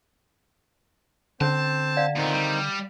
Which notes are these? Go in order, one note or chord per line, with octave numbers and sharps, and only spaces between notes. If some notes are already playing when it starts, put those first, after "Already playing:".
D3 C4 C#4 C5 A5
D5 F5 F#5
A#2 D#3 B3 C4 D#4
G3